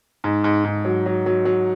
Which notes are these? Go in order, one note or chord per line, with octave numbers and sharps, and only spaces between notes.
G#2
G#2
G#2
F#3
F#3
F#3
F#3